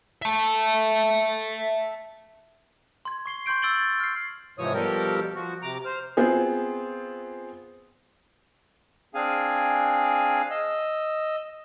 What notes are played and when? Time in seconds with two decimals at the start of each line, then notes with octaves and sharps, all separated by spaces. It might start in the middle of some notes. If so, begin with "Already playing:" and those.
0.22 E5 A5
3.05 C6 G#6
3.26 C#6 C7 G7
3.46 C6 C#6 G6 D7
3.62 E6 G#6 A6 D7 F#7 G7
3.78 A6
4.00 F6 C7
4.58 G#2 C3 E3 F3 C#5 D#6
4.74 B2 F3 G3 G4 A4 A#4
5.35 F3 F#4
5.63 C3 A#5 D6
5.85 C5 F6
6.17 B3 C4 F4 G#4
9.15 C4 D4 G#4 F5 G#5
10.51 D#5 E6